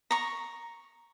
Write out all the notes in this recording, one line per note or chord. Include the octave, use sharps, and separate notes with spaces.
A#5 C#6